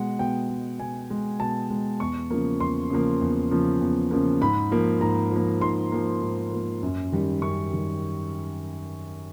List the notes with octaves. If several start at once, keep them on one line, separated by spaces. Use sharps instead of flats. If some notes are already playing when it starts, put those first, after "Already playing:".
Already playing: B2 G#3 F#5
B2 G5
G#3
B2 G#5
G#3
B2 A5
G#3
E2 C#6
C#3 F3 A#3
E2 C6
C#3 F3 A#3
E2
C#3 F3 A#3
E2
C#3 F3 A#3
G#2 B5
F3 A#3
G#2 A#5
F3 A#3
G#2 C6
F3 A#3
G#2
F3 A#3
F#2
D#3 G3
F#2 C#6
D#3 G3